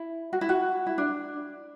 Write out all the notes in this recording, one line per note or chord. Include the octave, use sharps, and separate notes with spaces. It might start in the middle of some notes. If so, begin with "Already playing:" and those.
Already playing: E4
F#4
E4
F#4
E4
D4